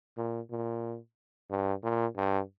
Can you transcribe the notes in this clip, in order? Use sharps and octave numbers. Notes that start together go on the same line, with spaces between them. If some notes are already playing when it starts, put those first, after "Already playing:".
A#2
A#2
G2
A#2
G2